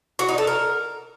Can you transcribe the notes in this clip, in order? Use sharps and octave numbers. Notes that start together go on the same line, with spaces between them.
F#4
D#4
A4
A#4